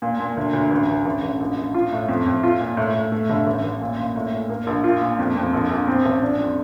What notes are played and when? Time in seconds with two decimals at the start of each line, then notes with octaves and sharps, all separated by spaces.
0.02 A#2
0.20 A#2
0.37 D2
0.54 D2
0.71 A1
0.89 A1
1.05 A1
1.23 A1
1.40 A#1
1.58 A#1
1.74 F4
1.92 A2
2.08 F2
2.26 F2
2.43 F4
2.61 A#2
2.77 A2
2.94 A2
3.12 A3
3.30 G1
3.47 A1
3.63 A1
3.81 A#2
3.99 A#2
4.16 A2
4.32 A2
4.49 A#3
4.67 A#1
4.84 F4
5.01 A#2
5.19 F2
5.36 F2
5.53 A#1
5.70 A#1
5.88 C4
6.05 A1
6.22 D4
6.38 F2